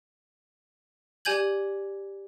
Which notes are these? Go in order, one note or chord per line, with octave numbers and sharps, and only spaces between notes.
G4 D5 G#5 G6 G#6 F#7